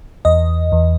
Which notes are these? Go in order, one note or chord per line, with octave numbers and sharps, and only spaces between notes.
E2 D#5
E2